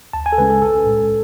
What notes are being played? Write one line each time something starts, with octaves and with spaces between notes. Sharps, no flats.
D2 A5
G#5
A4
C#3 G#3 C#4 B4
A4
B1 A4
A2 G#3